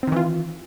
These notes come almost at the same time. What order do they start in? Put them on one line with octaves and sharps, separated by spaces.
C4 D#3 E3 F4